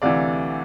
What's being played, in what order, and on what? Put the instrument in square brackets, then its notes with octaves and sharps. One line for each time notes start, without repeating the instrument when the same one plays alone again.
[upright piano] D2 C3 E3 D5 F5